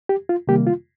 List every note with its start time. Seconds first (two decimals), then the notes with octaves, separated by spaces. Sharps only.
0.09 G4
0.29 F4
0.48 C3 D#3 G3 A#3 G4
0.67 F4